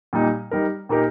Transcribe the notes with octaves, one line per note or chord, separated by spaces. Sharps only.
A#2 G3 D#4
G3 D#4 A#4
A#2 A#3 D#4 G4 A#4